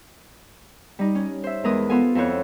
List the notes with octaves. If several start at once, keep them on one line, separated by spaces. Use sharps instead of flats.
G3 D#4
C#4
C5 E5
E2 G#3 A#4 B4 D#6
B3 F4 A4 G#5
F2 E4 A4 C5 C#5 F#6